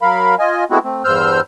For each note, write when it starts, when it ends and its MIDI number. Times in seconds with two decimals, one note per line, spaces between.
0.02 0.35 54
0.02 0.35 70
0.02 0.35 77
0.02 0.35 83
0.39 0.64 65
0.39 0.64 75
0.39 0.64 80
0.71 0.79 56
0.71 0.79 57
0.71 0.79 59
0.71 0.79 60
0.71 0.79 64
0.71 0.79 66
0.84 1.03 57
0.84 1.03 60
1.04 1.41 40
1.04 1.41 43
1.04 1.41 72
1.04 1.41 88
1.04 1.41 89
1.04 1.41 91